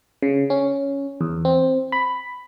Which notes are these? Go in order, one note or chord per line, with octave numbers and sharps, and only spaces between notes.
C#3
C#4
E2
C4
B5